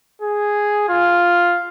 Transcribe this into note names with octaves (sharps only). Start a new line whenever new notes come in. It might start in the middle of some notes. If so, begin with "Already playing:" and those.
G#4
F4